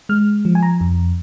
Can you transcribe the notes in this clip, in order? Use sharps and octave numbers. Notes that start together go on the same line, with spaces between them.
G#3 F6
F3
G#5
A#5
F2